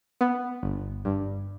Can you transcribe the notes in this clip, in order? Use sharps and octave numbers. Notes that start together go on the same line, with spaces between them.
B3
G1
G2